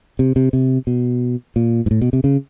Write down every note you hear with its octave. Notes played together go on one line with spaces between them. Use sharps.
C3
C3
C3
B2
A#2
G#2
A2
B2
C3
C#3